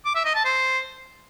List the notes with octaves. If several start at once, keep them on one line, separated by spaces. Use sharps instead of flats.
D6
E5
D#5
A5
C5